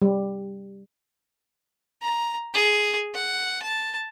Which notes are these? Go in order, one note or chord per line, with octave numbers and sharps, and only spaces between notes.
G3
A#5
G#4
F#5
A5